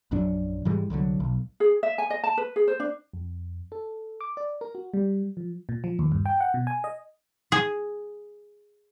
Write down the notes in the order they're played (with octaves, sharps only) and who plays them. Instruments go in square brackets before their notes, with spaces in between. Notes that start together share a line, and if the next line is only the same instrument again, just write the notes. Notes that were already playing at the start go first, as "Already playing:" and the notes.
[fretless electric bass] A#1 F#2 F#3 D4
G#2 E3 G3 G#3
C2 D3 D#3 F#3
B1
[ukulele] G#4
E5
G#5
D#5
A5
B4
G#4
C5
D4
[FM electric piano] F2
A4
D6
D5
A#4
F#4
G3
F3
A#2
F3
D#2
G2
G5
F#5
B2
G#5
D#5
[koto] G#4